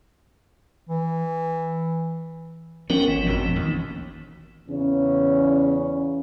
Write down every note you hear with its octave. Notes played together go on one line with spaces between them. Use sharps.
E3
F3 B3 C#4 A#4 G5
G#1 E3
A#1 F2 B2
D#2
E2 C#3 C#4